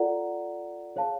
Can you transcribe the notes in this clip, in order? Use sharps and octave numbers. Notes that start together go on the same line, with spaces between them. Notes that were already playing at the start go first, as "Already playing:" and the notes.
Already playing: F4 A4 D5 F#5 A#5
G#4 C#5 F5 A5